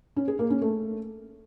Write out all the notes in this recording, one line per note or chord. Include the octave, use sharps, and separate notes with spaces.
C#4
G#4
A#3
C#4
A3